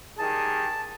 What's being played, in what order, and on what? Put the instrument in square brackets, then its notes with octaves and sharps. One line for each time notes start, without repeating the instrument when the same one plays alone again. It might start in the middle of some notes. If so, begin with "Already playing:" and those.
[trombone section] D#3 G3 G#4 [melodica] A5